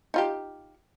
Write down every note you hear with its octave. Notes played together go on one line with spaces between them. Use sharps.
D#4 F4 G4